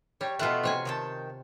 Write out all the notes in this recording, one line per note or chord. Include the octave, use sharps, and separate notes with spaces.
G3 C#5
B2 A3 B3 F4 F#5
C3 C#5 G#5
D#3 G5 A5